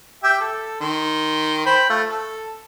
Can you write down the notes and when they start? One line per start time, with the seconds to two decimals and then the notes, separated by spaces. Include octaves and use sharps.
0.23 G4 E5 G5
0.40 A4
0.81 D#3 C6
1.66 C5 G5 B5
1.89 A3 F4
2.09 A4